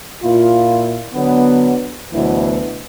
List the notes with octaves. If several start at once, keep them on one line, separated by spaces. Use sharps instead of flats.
A#2 E4 F4
D3 F#3 B3
D2 B2 E3 F#3 E4